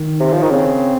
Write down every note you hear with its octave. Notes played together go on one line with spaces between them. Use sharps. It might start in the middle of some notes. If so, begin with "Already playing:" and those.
Already playing: D#3
C3
F3
D#3
C#3 C4